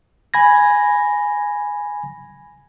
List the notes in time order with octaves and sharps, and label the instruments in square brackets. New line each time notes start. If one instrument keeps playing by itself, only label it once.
[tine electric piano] G#5 B5 G#6 A#6